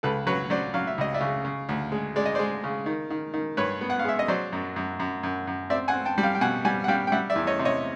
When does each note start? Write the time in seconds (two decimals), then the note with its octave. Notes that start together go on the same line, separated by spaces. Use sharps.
0.03 C#2 A4 B4
0.27 F#3 B4 C#5
0.50 F#3 C5 D5
0.74 F#3 F5
0.87 E5
0.98 C#2 D#5
1.14 D5 E5
1.21 C#3
1.45 C#3
1.69 D2
1.92 G#3
2.16 G#3 D5
2.26 D#5
2.35 G#3 C5 D5
2.64 C#3
2.86 D#3
3.10 D#3
3.33 D#3
3.57 G2 B4 C#5
3.81 B3
3.90 F#5
3.99 F5
4.05 G#3 E5
4.19 D#5
4.28 F#3 C5 D5
4.52 F#2
4.76 F#2
4.99 F#2
5.23 F#2
5.47 F#2
5.70 C4 D5 E5
5.88 F#5 G#5
5.94 C4
6.05 G5 A5
6.18 G3
6.23 F5 G5
6.35 G5
6.41 B2 F#5 G#5
6.65 G3 F#5 G#5
6.84 F#5
6.88 G3 F5 G5
7.07 G5
7.12 G3 E5 F#5
7.30 D5 E5
7.36 E2
7.47 C#5 D#5
7.59 C3
7.65 C#5 D#5